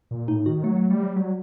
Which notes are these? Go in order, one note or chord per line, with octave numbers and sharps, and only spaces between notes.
A#2
A2 D#4
D#3 F#4
F#3 A3
A3
G3 A3
F#3
F#3 G3